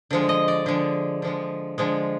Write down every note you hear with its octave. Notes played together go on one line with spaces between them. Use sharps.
D3 F3 G#3
D#5
D5
D3 F3 G#3
D3 F3 G#3
D3 F3 G#3